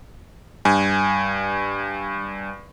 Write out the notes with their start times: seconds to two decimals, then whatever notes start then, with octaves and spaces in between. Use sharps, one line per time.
0.65 G2 G#5